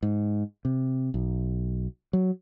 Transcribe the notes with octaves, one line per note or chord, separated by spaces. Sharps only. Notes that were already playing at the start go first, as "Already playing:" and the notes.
G#2
C3
B1
F#3